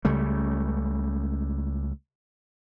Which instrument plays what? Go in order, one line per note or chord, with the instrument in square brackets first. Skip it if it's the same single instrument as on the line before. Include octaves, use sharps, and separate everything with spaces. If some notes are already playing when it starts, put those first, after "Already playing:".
[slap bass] C#2 C#3 G3 A3